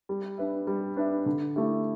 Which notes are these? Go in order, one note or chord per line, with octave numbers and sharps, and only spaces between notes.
G3
D4 B4 E5
G3
D4 B4 E5
D3
A3 E4 G4